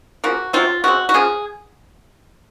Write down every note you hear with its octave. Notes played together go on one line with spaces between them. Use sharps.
C#3 F3 A#3 F#4
C3 F#3 C4 F4
C#3 G#3 C4 F#4
F#4
C#3 F3 G#4